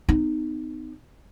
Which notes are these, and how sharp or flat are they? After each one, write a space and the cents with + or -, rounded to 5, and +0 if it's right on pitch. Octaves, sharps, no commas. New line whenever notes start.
B3 +40 D#4 -15